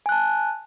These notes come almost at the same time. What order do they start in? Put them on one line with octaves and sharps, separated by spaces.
G#5 F#6 A5